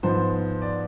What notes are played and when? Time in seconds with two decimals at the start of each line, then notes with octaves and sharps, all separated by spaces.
0.03 G#2 F3 B3 C5
0.62 D5